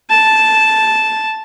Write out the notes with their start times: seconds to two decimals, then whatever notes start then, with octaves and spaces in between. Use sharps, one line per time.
0.10 A5